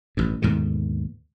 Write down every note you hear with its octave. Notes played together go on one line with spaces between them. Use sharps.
A1 G2
D#2 G#2 B2 D3